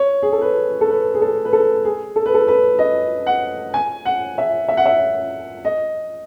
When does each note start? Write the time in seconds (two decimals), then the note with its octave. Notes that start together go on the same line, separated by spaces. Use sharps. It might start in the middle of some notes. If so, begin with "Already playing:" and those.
Already playing: C#5
0.23 G#4
0.32 A4
0.41 B4
0.81 A4
0.90 B4
1.14 G#4
1.21 A4
1.45 B4
1.53 A4
1.85 G#4
2.16 A4
2.26 B4
2.34 A4
2.48 B4
2.79 D#5
3.27 F#5
3.74 G#5
4.05 F#5
4.38 E5
4.68 E5
4.77 F#5
4.86 E5
5.65 D#5